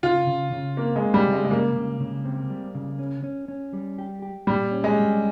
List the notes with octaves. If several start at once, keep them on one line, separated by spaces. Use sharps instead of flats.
C#3 F4
C#3
C#3
A#3 C4
G#3
C4
G3
C#3
G#3
G#3
C#3 A#3
C#3
C#3
C4
G3
C#3
C#4
C#4
C#4
G3
G4
G4
A#2 G3
C#4
G#3
G3